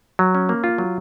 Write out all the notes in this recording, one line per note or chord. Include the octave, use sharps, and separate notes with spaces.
F#3
C#4
A#3
F4
F#3